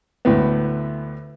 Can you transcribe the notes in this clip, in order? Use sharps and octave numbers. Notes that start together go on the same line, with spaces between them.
D2 A2 B3